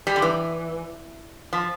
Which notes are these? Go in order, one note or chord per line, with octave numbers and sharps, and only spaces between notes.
G3
D3
E3
F3